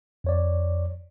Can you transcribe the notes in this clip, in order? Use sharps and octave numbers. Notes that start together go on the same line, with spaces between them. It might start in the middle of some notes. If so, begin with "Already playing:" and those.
F2 C#5 D5